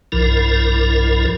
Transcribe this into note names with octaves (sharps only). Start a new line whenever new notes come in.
B1 G2 F3 E4 A#4